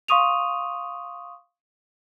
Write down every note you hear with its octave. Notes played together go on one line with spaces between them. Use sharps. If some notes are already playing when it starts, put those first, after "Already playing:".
F5 C6 C#6 D#6 D#7 F7